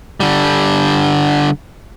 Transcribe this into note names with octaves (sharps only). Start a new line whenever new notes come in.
D3 G3